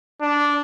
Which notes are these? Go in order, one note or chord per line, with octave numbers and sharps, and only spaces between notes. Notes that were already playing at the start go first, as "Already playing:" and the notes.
D4